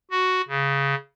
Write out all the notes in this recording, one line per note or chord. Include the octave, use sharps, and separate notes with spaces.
F#4
C#3